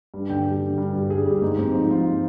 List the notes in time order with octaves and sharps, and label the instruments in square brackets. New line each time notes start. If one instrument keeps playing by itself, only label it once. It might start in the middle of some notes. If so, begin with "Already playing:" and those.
[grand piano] G2
D3 G5
G3
D3
G2
G3
G2 G#4
G2 G4
G#2 D#4
G#2 C4
F3 D#4
G#2 F4
F3